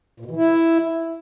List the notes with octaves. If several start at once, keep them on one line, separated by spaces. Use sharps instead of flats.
A#2
B2
E3
E4